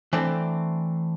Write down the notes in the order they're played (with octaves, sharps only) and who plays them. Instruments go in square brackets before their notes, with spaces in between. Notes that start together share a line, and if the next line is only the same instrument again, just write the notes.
[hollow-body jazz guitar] E3 A3 C4 D4